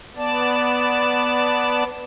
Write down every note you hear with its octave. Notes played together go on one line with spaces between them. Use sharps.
B3 D5 A5